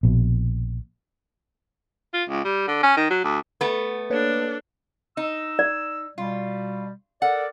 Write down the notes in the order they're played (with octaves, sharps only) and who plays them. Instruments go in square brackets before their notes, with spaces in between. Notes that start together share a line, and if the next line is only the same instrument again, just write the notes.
[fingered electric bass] A#1 B2
[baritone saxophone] F4
C#2
G3
D3
C#4
D#3
F#3
D2
[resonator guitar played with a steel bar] A3 B3
[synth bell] A#3 B4 C#5 [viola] D4 A4
[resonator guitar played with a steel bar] D#4 [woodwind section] E6
[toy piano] D5
[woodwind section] B2 G3 [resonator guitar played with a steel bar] F4
[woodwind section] A4 A#4 D5 [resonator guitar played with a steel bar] F#5